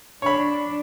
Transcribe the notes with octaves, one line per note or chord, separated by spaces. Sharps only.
D4 C#5 B5